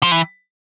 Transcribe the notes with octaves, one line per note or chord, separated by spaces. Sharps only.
F3
E3